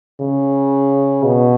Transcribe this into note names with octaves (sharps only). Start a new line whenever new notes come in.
C#3
B2